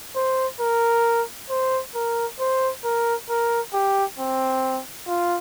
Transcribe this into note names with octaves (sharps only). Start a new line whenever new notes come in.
C5
A#4
C5
A#4
C5
A#4
A#4
G4
C4
F4